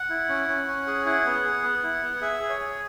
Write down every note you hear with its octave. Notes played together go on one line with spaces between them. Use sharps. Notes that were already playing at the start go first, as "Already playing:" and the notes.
Already playing: F#5
E4
C#4
C#4
C#4
G#4
E4 F#5
B3
G#4
B3
E4
B3
G#4 E5
G#4
C#5
G#4